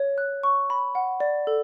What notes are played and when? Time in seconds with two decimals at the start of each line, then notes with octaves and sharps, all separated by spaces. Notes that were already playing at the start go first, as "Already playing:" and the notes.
Already playing: C#5
0.18 F#6
0.43 C#6
0.70 B5
0.95 F#5
1.20 D5
1.47 A4